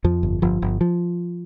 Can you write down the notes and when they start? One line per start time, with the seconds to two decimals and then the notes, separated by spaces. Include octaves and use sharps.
0.04 F2 F3
0.23 G1
0.42 G1 F3
0.62 G1
0.81 F3